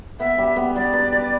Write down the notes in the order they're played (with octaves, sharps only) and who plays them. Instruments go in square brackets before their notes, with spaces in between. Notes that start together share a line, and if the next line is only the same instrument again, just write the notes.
[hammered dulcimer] B3 [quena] E5
[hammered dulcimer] G3
B3
[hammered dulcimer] G3 [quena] D5
[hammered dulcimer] B4
B4